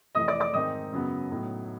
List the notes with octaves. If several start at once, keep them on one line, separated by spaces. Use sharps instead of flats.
F2 C3 E3 A3 D#5 D#6
D5 D6
D5 D6
G#2 D#3 G#3 C4 D#4 D#5 D#6
F#2 C#3 F#3 B3
A2 F#3 B3 D#4